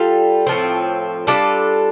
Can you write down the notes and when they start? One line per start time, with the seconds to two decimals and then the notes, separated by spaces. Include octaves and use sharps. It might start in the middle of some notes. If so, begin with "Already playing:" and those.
Already playing: G3 F4 A4
0.47 A2 F3 C4
1.27 G3 D4 F4 A4